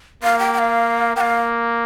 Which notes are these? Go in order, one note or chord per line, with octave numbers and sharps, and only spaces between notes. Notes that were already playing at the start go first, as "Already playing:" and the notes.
A#3 F5
G5
G5
F5
A#3 F5 G5